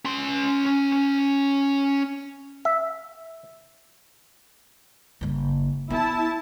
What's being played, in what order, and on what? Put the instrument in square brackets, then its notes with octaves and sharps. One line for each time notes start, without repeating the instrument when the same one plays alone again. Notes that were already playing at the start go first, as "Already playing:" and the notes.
[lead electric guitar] C#4 C6
[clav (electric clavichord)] E5
[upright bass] F#1 G3
[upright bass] B3 [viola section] E4 A5